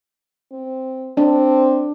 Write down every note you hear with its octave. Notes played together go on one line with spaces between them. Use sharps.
C4
C4 D4